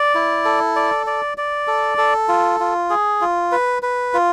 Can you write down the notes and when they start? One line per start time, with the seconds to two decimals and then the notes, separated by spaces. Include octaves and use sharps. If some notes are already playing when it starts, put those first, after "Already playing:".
Already playing: D5
0.15 E4
0.45 A4
0.76 D5
1.07 D5
1.38 D5
1.67 A4
1.98 A4
2.29 F4
2.60 F4
2.90 G#4
3.21 F4
3.52 B4
3.82 B4
4.14 F4